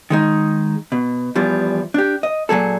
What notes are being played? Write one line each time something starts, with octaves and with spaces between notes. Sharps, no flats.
D#3 G#3 D#4
B2
E2 E3 F3 G3
D4 G4
D#5
A#2 F#3 G#4 A4